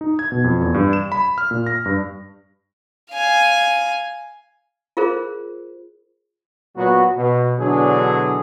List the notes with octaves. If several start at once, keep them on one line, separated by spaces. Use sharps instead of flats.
D#4
G#6
B2
F2
E2
G2
E7
B5
F6
A#2
A#6
G2
F5 G#5
F4 G#4 A#4 C5
A#2 F#3 B3 F#4
B2
B2 D3 E3 F#3 D4 G#4